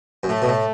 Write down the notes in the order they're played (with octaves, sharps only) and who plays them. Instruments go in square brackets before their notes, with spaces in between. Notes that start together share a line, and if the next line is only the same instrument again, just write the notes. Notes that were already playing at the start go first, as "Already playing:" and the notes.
[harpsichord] F#2
[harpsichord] A2 [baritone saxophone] A3
[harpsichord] B2
A2